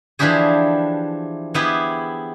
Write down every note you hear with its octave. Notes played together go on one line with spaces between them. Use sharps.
E3 F3 D4 E4 G4 G#4
B3 E4 G4 G#4